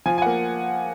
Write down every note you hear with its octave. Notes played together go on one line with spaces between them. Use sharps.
F3 G#5
G#5
A#3 F#5